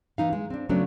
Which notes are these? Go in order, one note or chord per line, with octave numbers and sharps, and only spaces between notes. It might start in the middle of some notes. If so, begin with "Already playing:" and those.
E3 D#4 F5
G#3
C4 D4
C#3 F#3 A3 B3 C#4 D4